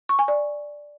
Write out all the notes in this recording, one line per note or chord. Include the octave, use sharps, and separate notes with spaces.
C#6
G#5
D5